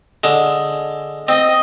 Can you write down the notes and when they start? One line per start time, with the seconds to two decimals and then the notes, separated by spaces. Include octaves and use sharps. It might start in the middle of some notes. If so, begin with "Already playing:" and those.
0.24 D3 G#3
1.28 C4 D#5